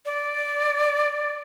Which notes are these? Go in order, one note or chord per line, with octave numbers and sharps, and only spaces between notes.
D5